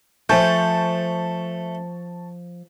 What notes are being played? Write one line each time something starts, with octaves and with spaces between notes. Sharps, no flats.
F3 A3 C5 G#5 A5 C#6 G6